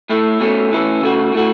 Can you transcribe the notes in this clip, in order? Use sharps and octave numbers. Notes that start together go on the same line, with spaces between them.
A2 A3 E4
B2 A3 C#4
A2 E3 C#4 E4
C#3 A3 F#4
A2 A3 F#4